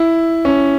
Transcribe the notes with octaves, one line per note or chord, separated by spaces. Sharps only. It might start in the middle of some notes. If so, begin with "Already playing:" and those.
Already playing: E4
C#4